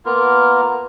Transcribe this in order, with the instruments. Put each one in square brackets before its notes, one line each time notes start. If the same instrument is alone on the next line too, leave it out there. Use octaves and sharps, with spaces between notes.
[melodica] A#3 B3 F4 A#4